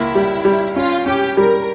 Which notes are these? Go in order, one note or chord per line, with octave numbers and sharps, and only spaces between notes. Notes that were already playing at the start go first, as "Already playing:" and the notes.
Already playing: C#2 A#3 E4
G3
G3
C#4 F4
C#4 G4
G3 A#4